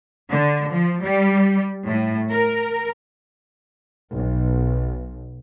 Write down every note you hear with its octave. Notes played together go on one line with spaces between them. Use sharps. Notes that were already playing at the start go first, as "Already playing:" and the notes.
D3
F3
G3
A2
A#4
B1